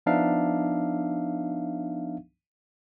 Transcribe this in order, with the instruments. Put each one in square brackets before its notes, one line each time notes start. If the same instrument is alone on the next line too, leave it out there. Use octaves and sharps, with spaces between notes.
[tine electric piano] F3 B3 D4 D#4 E5 F5